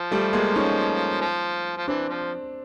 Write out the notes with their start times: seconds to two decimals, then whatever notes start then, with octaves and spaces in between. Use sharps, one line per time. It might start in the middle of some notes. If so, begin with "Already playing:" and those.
Already playing: F3
0.11 G3 A3
0.33 G#3 A#3
0.56 C#4 D#4
1.21 F3
1.77 F3
1.88 E3 C4 D4
2.09 F3